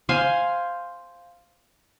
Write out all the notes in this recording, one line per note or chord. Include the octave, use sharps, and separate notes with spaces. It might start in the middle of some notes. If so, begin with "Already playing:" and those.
C5 F5 G#5